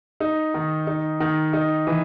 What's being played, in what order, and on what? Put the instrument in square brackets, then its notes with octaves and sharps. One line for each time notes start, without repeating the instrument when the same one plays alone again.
[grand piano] D#4
D#3
D#4
D#3
D#4
E3